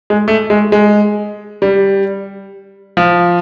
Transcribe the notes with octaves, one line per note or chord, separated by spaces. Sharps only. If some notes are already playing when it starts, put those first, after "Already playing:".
G#3
A3
G#3
G#3
G3
F3